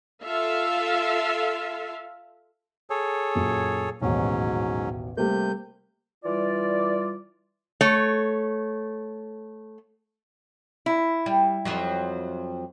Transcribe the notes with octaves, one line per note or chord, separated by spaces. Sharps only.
F4 A4 E5 F5
G#4 A4 C#5
F#2 A#2
A1 D#2 G#2 B2 F#3 C#4
C3 G3 A3 A#3 G6
E3 G3 F4 D5
A3 C#5
E4
G3
F2 F3 F#3